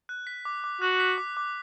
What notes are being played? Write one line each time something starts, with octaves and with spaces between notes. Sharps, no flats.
F#6
B6
D6
D6
F#4 F#6
B6
D6
D6